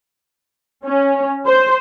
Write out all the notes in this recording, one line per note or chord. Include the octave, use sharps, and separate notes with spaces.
C#4
C5